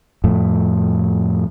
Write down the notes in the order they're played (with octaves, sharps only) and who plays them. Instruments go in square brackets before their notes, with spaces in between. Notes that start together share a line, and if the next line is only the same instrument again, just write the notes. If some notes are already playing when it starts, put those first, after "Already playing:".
[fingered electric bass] F2 A2